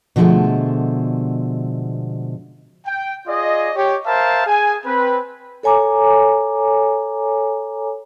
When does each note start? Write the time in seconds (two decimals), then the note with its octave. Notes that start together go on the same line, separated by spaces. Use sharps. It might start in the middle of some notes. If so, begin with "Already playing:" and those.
0.16 B2 D3 F3 F#3 G#3 A3
2.86 G5
3.27 F4 G#4 D5 D#5
3.75 G4 C#5
4.06 A#4 C5 E5 F5 A5
4.46 G#4 G#5
4.86 C4 B4
5.63 A4 C#5 G#5 A#5 D6